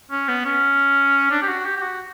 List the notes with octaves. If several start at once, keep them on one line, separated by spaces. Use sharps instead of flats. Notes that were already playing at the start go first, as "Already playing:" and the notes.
C#4
B3
C#4
D4
G4
F#4
G4
G4
F#4